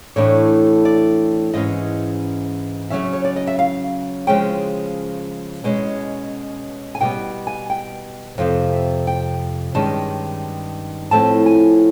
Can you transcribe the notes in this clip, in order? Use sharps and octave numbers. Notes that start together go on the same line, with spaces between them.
A2 E3 A3 D4 C#5
D5
G#2 E3 G#3 C#4 D#5
C#3 F#3 A3 C#4 E5
C#5
D5
D#5
E5
F5
C#3 F3 G#3 C#4 G5
B2 G#3 C#4
G#5
B2 G3 B3 G5
G#5
G5
F2 C3 F3 F5
E5
G5
G2 D#3 G#3 C#4 A5
A2 F3 A3 C4 A5
G#5